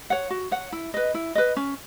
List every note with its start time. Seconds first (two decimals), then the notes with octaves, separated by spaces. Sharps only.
0.10 C#5 F#5
0.30 F#4
0.51 C#5 F#5
0.72 E4
0.94 B4 D#5
1.14 E4
1.35 B4 D#5
1.57 C#4